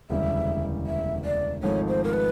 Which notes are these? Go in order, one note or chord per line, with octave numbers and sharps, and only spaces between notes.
E1 D2 C#3 E3 G3 E5
E5
D5
G#1 G#2 F3 A3 C#5
C5
A#4
B4